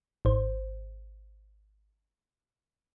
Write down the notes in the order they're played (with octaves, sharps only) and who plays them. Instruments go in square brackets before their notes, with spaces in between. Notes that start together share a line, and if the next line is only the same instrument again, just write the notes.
[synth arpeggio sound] G#1 C5